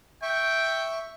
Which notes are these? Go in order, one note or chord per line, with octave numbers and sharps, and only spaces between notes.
E5 G5 C#6